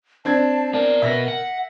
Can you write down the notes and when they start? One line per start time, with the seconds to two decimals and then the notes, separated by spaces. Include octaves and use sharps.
0.25 C4 D4 A5 G#6
0.74 B3 A#4 D5
1.02 B2 B3 E5 A#6
1.28 F#5